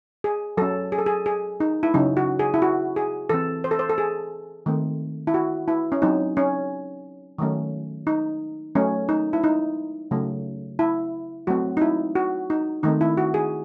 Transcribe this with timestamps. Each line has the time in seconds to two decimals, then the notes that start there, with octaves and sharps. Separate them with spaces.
0.24 G#4
0.57 F#3 C#4 A4
0.92 G#4
0.98 A4
1.06 G#4
1.26 G#4
1.60 D#4
1.83 E4
1.94 C#3 F#3 C#4 D#4
2.17 F#4
2.39 G#4
2.54 E4
2.62 F#4
2.96 G#4
3.30 E3 C4 A4
3.64 C5
3.71 A4
3.79 C5
3.90 A4
3.98 G#4
4.66 D#3 A3 C4
5.27 E4
5.34 F#4
5.68 E4
5.92 C#4
6.02 F#3 C4 D#4
6.37 C#4
7.38 D#3 F#3 A3 C#4
8.07 D#4
8.75 F#3 A3 C#4
9.09 D#4
9.33 E4
9.44 D#4
10.11 C#3 F#3 A3
10.79 E4
11.47 F#3 A3 C4 F#4
11.77 D#4
11.81 E4
12.15 F#4
12.50 D#4
12.83 D#3 A3 C4 D#4
13.01 E4
13.17 F#4
13.34 G#4